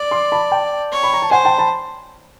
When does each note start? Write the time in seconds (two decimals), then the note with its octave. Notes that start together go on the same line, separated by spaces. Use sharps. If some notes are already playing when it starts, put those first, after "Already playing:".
Already playing: D5
0.11 C6 D6
0.32 A5 B5
0.51 G5 A5
0.92 C#5
1.04 B5
1.13 A#5
1.22 A5
1.31 C5 F#5 G#5
1.45 G5 A5
1.58 A5 B5